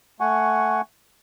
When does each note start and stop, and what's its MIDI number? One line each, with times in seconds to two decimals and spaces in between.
0.20 0.81 57
0.20 0.81 78
0.20 0.81 80
0.20 0.81 85